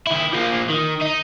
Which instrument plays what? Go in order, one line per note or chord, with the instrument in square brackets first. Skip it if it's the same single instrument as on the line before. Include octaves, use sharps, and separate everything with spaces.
[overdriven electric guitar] D#3 E4
F3 A#3
D#3
D#4